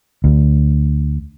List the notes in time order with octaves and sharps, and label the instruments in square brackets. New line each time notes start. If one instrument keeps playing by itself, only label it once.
[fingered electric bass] D2